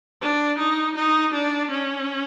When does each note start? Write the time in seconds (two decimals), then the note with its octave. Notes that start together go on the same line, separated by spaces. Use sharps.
0.21 D4
0.59 D#4
0.96 D#4
1.34 D4
1.71 C#4